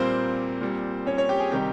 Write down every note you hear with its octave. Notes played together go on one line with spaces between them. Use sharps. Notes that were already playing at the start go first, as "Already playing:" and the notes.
Already playing: A#2 G3 A#3 C4 A#4 C5
A#2 G3
C#4 C#5
C#4 C#5
G4 G5
G#4 G#5
C3 D#3 G3 G4 G5